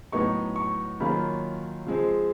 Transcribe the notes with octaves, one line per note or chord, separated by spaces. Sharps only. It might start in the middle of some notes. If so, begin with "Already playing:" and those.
A2 F#3 B3 D#4 C#6
C#6
D#3 F#3 A#3 C#4 F4 B5
F3 G#3 C4